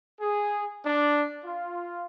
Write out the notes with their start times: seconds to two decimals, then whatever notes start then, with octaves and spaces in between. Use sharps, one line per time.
0.21 G#4
0.85 D4
1.45 F4